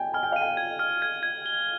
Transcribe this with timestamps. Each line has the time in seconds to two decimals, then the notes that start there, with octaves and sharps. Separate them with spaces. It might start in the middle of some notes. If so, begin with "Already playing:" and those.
Already playing: G5 G#5
0.14 G#5 F6
0.23 G5
0.32 F5
0.36 D#7
0.41 G5
0.57 G#6
0.79 F6
1.02 G#6
1.23 G#6
1.46 G7